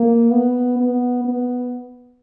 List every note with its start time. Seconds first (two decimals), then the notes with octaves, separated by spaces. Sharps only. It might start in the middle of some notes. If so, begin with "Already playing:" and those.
Already playing: A#3
0.31 B3
0.78 B3
1.25 B3